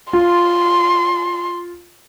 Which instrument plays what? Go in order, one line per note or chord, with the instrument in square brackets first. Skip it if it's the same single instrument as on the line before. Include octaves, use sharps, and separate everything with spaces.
[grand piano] F4 [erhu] C6